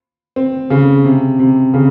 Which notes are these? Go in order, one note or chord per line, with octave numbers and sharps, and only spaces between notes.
C4
C#3
C3
C3
C#3